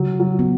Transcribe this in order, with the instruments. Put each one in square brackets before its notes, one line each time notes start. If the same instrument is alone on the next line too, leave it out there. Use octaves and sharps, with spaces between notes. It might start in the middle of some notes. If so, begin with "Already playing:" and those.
Already playing: [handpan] C#3 [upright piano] F#3
[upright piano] F#3
[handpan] B3